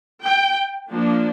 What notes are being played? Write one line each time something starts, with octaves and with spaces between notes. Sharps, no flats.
G5
F3 A#3 D4